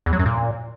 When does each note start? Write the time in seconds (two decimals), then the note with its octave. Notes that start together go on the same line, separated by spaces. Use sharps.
0.06 E2
0.13 F#3
0.19 F#2
0.26 A#2